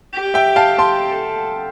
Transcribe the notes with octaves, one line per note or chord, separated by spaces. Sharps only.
G4
E5 G5
F5 A5
G4 A5 C6
A4